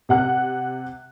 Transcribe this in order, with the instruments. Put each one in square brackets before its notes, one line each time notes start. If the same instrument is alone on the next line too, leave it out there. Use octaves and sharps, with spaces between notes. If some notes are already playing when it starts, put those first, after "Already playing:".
[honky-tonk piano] C3 F#5 F#6